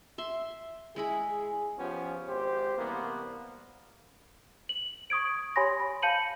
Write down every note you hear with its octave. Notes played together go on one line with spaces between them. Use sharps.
E5 C6
G#3 E4 G#4 B5
F3 B3 C#4 F4 G4
G#1 G4 C5
C2 E3 A#3 B3
F#7
C#6 D#6 G#6 D7
G4 C#5 G#5 B5 C6 A#6
B5
F5 A5 G6 C#7 D#7 F#7